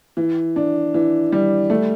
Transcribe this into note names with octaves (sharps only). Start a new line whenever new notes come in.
E3
D4
E3
G3
A3